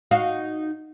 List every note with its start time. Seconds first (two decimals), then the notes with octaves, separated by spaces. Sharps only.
0.11 D#4 F#4 F5